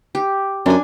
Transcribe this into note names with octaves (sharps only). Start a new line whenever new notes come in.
G4
F#2 D4 G#5